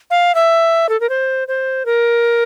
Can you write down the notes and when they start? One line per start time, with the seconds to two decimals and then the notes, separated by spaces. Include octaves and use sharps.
0.10 F5
0.35 E5
0.89 A4
1.00 A#4
1.09 C5
1.48 C5
1.86 A#4